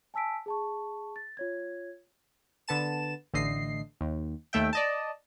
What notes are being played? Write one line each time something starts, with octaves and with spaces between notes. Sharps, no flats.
G#5 A5 E6 B6 D7
G#4 A5 C#6
A6
F4 C#5 G#6
D3 B3 A5 E7
A1 D3 A3 D#5 C7
D#2
D#2 A3 E5 G5
D5 D#5 A5